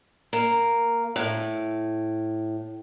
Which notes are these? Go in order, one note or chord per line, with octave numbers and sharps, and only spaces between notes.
A#3
A2